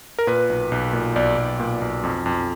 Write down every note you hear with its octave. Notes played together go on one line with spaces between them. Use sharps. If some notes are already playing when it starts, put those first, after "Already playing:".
A#4
A#2 B4
B1
B1
A#2
B1 D5
B1
A#2
B1
F2
F2